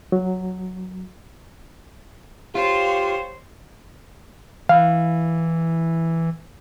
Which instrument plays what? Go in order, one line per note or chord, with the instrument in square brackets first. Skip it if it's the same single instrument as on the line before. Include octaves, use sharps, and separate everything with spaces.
[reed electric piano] F#3
[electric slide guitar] F4 [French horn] G4 [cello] C5 C#5
[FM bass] E3 [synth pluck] F5